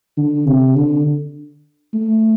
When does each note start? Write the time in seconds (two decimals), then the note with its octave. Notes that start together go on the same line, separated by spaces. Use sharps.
0.17 D3
0.46 C3
0.76 D3
1.94 A3